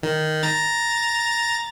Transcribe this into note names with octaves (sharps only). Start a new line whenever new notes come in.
D#3
A#5 A6